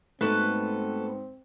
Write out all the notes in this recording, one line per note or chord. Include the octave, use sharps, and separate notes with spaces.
G#2 A3 B3 C4 F#4 A4 B4